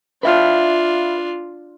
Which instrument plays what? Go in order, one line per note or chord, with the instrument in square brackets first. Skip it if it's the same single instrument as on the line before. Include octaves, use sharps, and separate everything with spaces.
[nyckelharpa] D4 F4 [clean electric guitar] B4 E5 F5